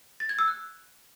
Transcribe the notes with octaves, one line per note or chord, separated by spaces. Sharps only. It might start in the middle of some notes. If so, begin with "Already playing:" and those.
A6
G#6
E6
F#6